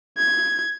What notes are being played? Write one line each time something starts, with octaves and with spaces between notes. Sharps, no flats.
G#6